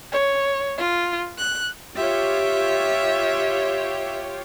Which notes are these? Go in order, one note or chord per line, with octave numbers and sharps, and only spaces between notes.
C#5
F4
F#6
F4 G4 C#5 E5